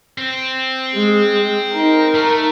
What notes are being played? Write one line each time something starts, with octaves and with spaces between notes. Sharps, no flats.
C4
G#3
D#4 A#4
A3